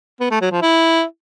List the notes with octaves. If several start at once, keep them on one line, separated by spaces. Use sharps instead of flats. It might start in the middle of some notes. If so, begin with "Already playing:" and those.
B3
A3
F#3
F3
E4